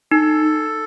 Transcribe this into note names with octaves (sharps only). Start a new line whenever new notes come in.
D#4 A4